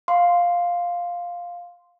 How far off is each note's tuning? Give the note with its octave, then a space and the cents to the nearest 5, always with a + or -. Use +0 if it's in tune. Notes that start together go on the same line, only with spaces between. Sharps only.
F5 +5 C6 +0